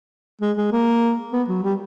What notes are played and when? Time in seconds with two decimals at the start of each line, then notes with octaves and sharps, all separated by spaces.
0.41 G#3
0.57 G#3
0.72 A#3
1.32 B3
1.48 F#3
1.63 G3